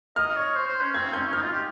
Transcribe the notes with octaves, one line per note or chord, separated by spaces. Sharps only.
D#5 F6
C#5
C5
C5
C#4
C4 G#6
C#4 G6
C#4
D#4 F6
F4
G4